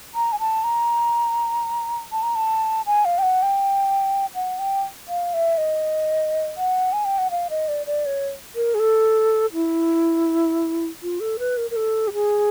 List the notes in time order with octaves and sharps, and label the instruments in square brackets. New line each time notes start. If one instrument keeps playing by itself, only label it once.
[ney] A#5
G#5
A5
A#5
A5
A#5
A5
G#5
F5
G5
F#5
G5
F#5
G5
F5
E5
D#5
F#5
G#5
G5
F#5
F5
D#5
D5
D5
C#5
A#4
G#4
A4
E4
F4
A4
B4
A#4
A#4
A4
G4
G#4